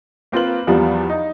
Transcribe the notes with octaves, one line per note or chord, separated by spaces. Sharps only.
A#3 C4 F4 B4 F#7
E2 F3 G3 B3
D#4